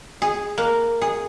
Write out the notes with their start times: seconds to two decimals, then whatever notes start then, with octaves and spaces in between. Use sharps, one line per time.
0.22 G#4
0.58 A#3
1.02 G#4